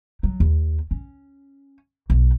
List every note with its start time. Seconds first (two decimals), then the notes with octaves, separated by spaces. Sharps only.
0.23 F#3
0.40 D#2
0.91 C#4
2.10 B1